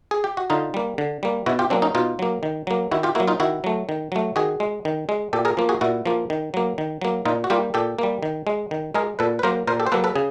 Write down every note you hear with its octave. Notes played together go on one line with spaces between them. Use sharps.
G#4
G4
F#4
D3 D#4 F4
G3 A#3
D3
G3 A#3
B2 E4 F#4
F4 G4
F#3 A#3 C4 D4
C#4 D#4
B2 D#4 F4
F#3 A#3
D#3
F#3 A#3
D#3 E4 F#4
F4 G4
F#3 A#3 E4 F#4
D#4 F4
D#3 E4 F#4
F#3 A3
D#3
F#3 A3
D#3 F#4 G#4
G#3
D#3
G#3
A#2 G4 A4
G#4 A#4
F3 A#3
F#4 G#4
A#2 E4 F#4
F3 A#3
D#3
F#3 A#3
D#3
F#3 A#3
A#2 D#4 F4
F#4
G3 A#3 F4 G4
A#2 G4 A4
G3 A#3
D#3
G#3
D#3
G#3 G#4 A#4
A#2 A4 B4
B4
F#3 A#3 A#4 C5
A#2 A#4 C5
G4 A4
C5
F#3 A#3 A4 B4
A4 B4
C#3 G#4